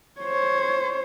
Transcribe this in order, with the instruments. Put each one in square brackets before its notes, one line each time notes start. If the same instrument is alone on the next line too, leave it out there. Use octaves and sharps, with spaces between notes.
[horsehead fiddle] C5 C#5